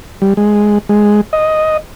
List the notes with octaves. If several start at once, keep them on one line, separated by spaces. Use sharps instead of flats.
G3
G#3
G#3
D#5